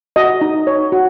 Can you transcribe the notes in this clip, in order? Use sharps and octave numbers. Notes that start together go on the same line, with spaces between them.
F#4 D#5
D#4
C#5
F#4